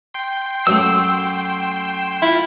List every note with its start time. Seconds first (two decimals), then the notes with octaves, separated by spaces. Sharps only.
0.14 G5 C6
0.67 F#2 A3 E6
2.22 E4 F4